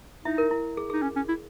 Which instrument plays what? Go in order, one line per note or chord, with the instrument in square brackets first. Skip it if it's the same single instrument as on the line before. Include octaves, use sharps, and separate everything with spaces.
[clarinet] D#4 [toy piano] E4 E5
[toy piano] A#4
E4
G#4
[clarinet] D#4 [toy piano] G#4
[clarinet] C#4
C#4
E4